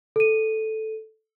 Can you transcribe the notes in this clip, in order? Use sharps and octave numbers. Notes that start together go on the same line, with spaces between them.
A4 D#7